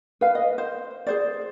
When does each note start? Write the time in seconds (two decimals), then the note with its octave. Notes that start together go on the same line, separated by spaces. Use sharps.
0.21 B4 F5
0.35 D#5
0.58 C5
1.07 G#4 C5 D5